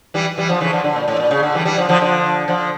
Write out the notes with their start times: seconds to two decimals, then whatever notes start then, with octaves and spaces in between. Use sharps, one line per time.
0.14 E3 G3
0.37 E3 G3
0.49 D3 F3
0.61 C#3 E3
0.73 D3 F3
0.84 D3
0.96 A#2
1.08 A2
1.20 A#2
1.31 C#3
1.43 D3
1.55 E3 G3
1.66 E3 G3
1.78 D3 F3
1.89 D3 F3
2.01 D3 F3
2.48 D3 F3